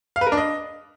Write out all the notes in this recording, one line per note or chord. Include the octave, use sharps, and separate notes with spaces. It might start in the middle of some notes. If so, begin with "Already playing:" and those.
F5
B4
A#4
D4
D#5